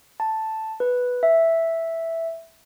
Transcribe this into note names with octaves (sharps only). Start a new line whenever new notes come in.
A5
B4
E5